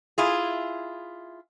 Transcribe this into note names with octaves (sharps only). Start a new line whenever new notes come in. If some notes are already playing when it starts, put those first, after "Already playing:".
E4 F4 G#4